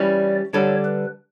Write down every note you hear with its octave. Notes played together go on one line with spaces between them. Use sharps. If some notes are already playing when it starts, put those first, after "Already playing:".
Already playing: E3 G3 C#4 D5
D3 G3 D4 A4 C#5
B4